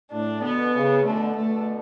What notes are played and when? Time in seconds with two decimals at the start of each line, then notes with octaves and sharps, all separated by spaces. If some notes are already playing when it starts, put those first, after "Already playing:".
0.12 A2 D4
0.42 B2 D3 B3
0.74 C#3
1.04 B2 D3 A3
1.36 B2 D3 A3